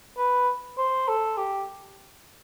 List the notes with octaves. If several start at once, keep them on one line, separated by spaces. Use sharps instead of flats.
B4
C5
A4
G4